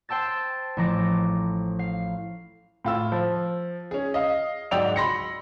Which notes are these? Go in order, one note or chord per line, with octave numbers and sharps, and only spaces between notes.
C5 G5 A5 E6 A6
A1 F3 A4 A#5 D6 A#6
F5
A2 F4 E6
F3
C#4 G#4
D#5 F5
G#2 F#3 D5 G5 E6 F7
B5 C6 A#6 C#7